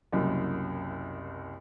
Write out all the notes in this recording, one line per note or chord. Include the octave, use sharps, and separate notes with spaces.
F#1 C2 F#2